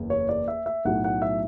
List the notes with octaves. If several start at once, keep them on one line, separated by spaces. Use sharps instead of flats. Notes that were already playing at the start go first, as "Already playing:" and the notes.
Already playing: F#1 E2
C#5
D5
E5
E5
B1 A2 F#3 A3 F#5
F#5
E5